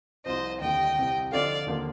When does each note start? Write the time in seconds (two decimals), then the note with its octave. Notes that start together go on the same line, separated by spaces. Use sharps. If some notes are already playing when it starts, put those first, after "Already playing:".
0.24 C2 C3 F3 C4 C5 D#5
0.60 D#2 D3 G3 D#5 G5
0.96 C2 C3 G3 C4
1.31 D3 F3 C4 D#4 A4 D5 F5
1.66 D#2 D3 F3 A#3